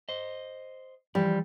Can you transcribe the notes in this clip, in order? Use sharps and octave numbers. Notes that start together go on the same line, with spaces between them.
C5 D#5
E3 F3 G3